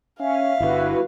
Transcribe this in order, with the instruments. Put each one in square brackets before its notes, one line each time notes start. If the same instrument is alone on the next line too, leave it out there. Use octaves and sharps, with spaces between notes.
[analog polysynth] C#4 [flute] E5 [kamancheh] F5
[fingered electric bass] G1 D3 [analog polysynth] E4 F#4 B4